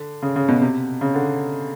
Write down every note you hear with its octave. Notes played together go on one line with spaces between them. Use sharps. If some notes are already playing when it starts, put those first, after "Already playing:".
Already playing: D3
C#3
C#3
B2
C3
C#3
D3